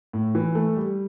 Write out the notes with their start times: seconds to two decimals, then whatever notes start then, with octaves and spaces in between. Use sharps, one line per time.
0.13 A2
0.35 E3
0.55 A3
0.77 G3